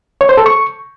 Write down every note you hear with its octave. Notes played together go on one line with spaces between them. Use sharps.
C#5
C5
A4
C#6